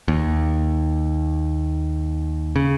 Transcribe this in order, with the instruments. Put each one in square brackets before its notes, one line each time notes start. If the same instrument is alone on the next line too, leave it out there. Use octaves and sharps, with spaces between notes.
[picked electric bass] D#2
C#3